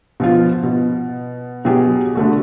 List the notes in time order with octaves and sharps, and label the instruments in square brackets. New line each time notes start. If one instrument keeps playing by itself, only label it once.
[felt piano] B2 F3 F4
B2
B2 F#3 G4 G#4
D3 A3 F#4